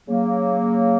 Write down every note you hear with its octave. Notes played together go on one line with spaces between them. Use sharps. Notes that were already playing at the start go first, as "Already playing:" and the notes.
C#3 F#3 A#3